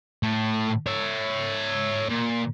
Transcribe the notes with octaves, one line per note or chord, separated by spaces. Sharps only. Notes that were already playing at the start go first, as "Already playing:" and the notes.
A2 A3
C#5 E5
A#2